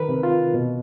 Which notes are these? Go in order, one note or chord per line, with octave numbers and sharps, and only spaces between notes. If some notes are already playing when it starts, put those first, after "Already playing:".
Already playing: D#3 A#4 B4
C3
F4
B2